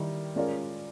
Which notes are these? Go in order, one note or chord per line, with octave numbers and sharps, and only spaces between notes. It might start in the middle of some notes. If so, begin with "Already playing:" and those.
Already playing: D#3 G3 E4
G#3 C#4 F4 A#4 D5